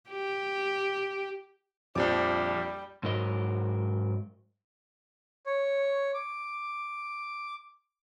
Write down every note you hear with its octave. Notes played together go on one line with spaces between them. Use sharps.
G4
A#1 F2 F3 G3 D6
G#2 F#3 A#4 D#5
C#5
D6